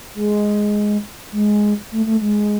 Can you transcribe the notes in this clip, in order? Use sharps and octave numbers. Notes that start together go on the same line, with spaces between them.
G#3
G#3
A3
A3
G#3